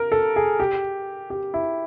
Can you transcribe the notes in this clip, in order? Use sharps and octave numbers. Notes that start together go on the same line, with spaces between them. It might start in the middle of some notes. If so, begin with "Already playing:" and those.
Already playing: A#4
A4
G#4
G4
G4
E4